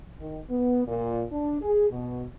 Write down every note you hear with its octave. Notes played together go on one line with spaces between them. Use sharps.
D#3
B3
A#2
D4
G#4
B2